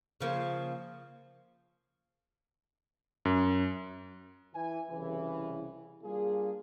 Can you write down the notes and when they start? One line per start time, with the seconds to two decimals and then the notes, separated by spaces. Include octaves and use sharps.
0.21 C#3 F3 A#3
3.25 F#2
4.55 E3 G#5
4.90 C2 C#3 E3
6.04 G3 A#3 D4 F4 G#4